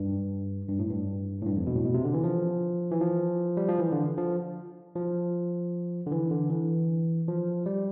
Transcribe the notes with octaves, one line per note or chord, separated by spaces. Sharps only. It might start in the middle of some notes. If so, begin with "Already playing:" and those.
Already playing: G2
G2
A2
G2
A2
G2
F2
B2
A2
B2
C3
D3
E3
F3
E3
F3
G3
F3
E3
D3
F3
F3
D3
E3
D3
E3
F3
G3